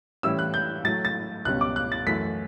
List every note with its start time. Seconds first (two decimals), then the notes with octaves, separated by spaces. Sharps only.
0.23 A2 E3 G3 C#4 E4 E6
0.39 F#6
0.54 G6
0.84 A2 F#3 A3 A6
1.05 A6
1.45 C#2 B2 G3 C#4 F#6
1.61 D6
1.76 F#6
1.92 A6
2.06 F#2 E3 A3 B6